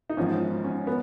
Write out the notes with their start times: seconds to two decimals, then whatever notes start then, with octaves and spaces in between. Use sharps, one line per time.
0.10 D#4
0.17 G#1 G#2 F3 C#4
0.64 C#4
0.87 B3